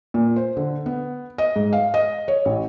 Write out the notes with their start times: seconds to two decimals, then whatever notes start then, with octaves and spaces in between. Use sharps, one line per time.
0.14 A#2
0.36 C5
0.57 D3
0.86 B3
1.38 D#5
1.56 G#2
1.73 F5
1.94 D#5
2.28 C#5
2.45 A1